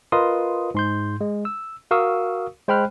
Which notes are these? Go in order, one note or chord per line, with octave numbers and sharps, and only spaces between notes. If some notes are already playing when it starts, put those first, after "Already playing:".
F4 A#4 B4 D#5 C6 D#6
G#2 C6 G6
G#3
E6
F#4 A#4 F5 C#6 D#6 E6
G#3 C5 G5 B5 F6 F#6